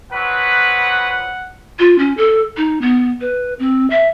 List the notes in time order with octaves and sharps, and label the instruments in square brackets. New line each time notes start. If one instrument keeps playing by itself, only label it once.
[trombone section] F3 F#3 B4 [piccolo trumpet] F#5
[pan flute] F4
C#4
A4
D#4
B3
B4
C4
E5